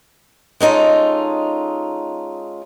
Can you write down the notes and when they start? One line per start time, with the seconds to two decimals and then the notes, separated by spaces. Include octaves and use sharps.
0.60 G#3 C#4 D#4 F4 A4